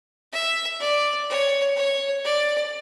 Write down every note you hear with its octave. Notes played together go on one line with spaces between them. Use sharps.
E5
D5
C#5
C#5
D5